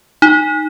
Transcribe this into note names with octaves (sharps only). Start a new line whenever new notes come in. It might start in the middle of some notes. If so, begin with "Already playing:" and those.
D#4